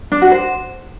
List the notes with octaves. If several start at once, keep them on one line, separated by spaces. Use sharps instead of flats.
D4
F#4
C5